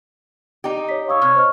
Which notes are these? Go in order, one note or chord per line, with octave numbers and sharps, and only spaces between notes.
D#4 G4
C#5 D5 B6
C#5 F5 D#6 E6
C3 F6 G#6
C5 D#5 F6